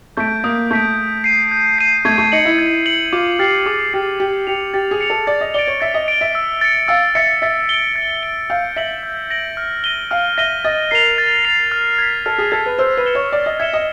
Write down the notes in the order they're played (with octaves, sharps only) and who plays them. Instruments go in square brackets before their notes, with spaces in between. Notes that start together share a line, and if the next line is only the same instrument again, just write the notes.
[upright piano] A3 [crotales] G6 B6 D7
[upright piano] A#3 [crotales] D#6
[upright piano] A3 [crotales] G6 B6 D7
[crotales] G6
C7 D#7
G6
C7 D#7
[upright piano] A3 [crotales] G#6
[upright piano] A3
[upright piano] D#4 [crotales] C#7 F#7
[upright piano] E4
[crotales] G#6
C#7 F#7
[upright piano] F4 [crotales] D6
[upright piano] G4 [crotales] F6 A6 C7
[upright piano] G#4 [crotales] D6
[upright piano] G4 [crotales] F6 A6 C7
[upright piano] G4 [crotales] A6
[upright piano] G4 [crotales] C#7 F7
[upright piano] G4 [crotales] A6
[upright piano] G#4
[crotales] C#7 F7
[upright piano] A4
[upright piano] D5 [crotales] A6
[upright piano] D#5
[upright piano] D5 [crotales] D7 G7
[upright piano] C#5
[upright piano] E5 [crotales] A6
[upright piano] D#5
[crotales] D7 G7
[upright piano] E5
[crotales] E6
A6 C#7
[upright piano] F5 [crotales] E6
[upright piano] E5 [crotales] A6 C#7
[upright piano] E5 [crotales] A6
[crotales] D7 G7
A6
D7 G7
[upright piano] F5 [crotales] G6
[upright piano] E5 [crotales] A#6 D7 F#7
[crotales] G6
A#6 D7 F#7
F6
A#6 D#7 G7
[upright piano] F5 [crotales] F6
[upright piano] E5 [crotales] A#6 D#7 G7
[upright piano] D#5 [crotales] A6
[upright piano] A#4 [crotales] C7 F7
[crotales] A6
C7 F7
F6
G#6 B6
[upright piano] A4 [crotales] F6
[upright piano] G#4
[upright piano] A4 [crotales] G#6 B6
[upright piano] B4
[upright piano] C5 [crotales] E6
[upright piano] B4
[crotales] G#6 C#7 E7 G7
[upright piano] C#5
[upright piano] D5 [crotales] E6
[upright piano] D#5
[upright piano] E5 [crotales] G#6 C#7 E7 G7
[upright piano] D#5